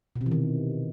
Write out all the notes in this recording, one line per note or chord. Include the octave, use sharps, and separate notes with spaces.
B2
C3
E3
D#3